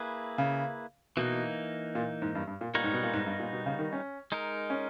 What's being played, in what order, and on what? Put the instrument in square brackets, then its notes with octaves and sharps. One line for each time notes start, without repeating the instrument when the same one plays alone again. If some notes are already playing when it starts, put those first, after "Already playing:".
Already playing: [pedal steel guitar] A#3 E4 G#4 B4
[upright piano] C#3
[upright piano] B2 [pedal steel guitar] E3 A#3 D#4
[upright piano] A#2
G#2
G2
G2
A#2
[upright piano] A#2 [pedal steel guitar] G3 B3 D#4 A#4 C#5
[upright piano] G#2
B2
A#2
G#2
G2
A#2
B2
C#3
D#3
C#4
[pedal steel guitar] G#3 D#4 A#4
[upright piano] C#4